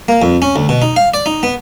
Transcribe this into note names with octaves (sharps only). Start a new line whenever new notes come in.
A#3
F2
C#4
D2
B2
D#4
F5
D5
D#4
B3